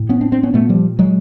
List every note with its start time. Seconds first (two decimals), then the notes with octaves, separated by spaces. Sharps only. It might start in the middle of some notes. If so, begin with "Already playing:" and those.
Already playing: A2
0.09 B3 C#4
0.21 C4 D4
0.32 C4 D4
0.43 B3 C#4
0.54 A#2 A3 B3
0.69 F3 G3
0.99 F#3 G#3